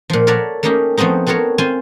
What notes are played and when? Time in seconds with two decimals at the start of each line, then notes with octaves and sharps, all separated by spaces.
0.10 A#2 F3
0.27 A4 A#4 C#5 D5 E5 F#5
0.63 A3 A#3 C#4 D#4 G4
0.97 F3 A3 B3 C4 D#4
1.27 B3 C4 A4 A#4 C#5
1.58 C4 F4 C5 G#5 C6